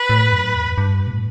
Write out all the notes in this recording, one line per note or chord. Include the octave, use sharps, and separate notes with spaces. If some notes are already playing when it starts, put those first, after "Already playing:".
Already playing: B4
A2
F#2
E2
G2
B2
A2